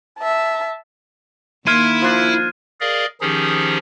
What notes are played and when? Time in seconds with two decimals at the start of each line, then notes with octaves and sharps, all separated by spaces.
0.19 E5 A5
1.67 D#3 A#3 E4 C6 F6 G#6 D#7
2.02 F3 D4
2.81 G#4 A#4 D5 D#5 F5
3.21 D#3 F3 C#4 D#4 G4 G#4